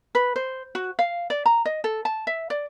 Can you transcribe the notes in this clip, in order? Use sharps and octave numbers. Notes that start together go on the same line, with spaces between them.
B4
C5
F#4
F5
D5
A#5
D#5
A4
A5
E5
D5